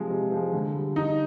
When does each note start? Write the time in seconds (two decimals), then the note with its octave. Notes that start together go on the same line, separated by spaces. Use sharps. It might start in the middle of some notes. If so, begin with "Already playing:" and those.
Already playing: C3 F3 G#3
0.10 C3
0.32 F3 G#3
0.53 D3
0.75 G3
0.96 D3 D#4